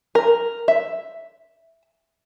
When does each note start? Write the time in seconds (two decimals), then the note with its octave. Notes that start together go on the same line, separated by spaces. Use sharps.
0.15 A#4
0.68 E5